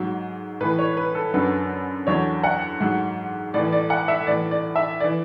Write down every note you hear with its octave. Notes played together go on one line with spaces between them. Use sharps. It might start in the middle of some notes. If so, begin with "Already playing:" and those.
Already playing: G#2 F#3
A2 E3 B4
C#5
B4
A4
F#2 D3 F#3 B4
E2 D3 F#3 C#5
F#5
G#2 F#3
A2 E3 D5
D5
F#5
E5
A2 E3 D5
D5
E5
E3 D5